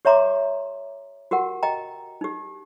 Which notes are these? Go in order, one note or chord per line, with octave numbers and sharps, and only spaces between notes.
G4 C#5 E5 A#5 C6 D6
F#4 G4 A#4 F#5
D#5 G5 A#5
D#4 G4